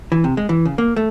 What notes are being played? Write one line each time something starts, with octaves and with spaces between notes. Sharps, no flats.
E3
C3
G#3
E3
C#3
A#3
A3